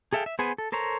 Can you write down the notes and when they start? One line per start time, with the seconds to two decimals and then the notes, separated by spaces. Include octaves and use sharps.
0.13 G#4 A4 E5 F5 G5
0.26 E5
0.39 B3 G#4 B4 C5 G#5
0.58 A4
0.72 A4 A#4 C5 C#5 A#5